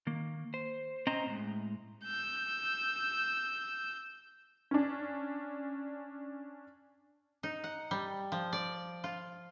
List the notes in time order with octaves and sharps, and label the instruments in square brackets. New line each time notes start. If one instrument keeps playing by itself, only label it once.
[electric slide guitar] D#3 A#3
C5
C4 C#4 C5 D#5 A#5
A2 G#3
[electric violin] E6 G6
[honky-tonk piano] C#4 D4
[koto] D#4
F#5
G3
F3
D5
F4